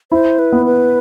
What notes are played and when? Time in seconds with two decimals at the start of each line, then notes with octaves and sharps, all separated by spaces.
0.12 E4 C5
0.39 B4
0.52 B3
0.66 B4